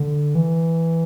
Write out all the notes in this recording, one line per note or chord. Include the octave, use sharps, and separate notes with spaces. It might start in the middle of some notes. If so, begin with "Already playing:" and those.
Already playing: D3
E3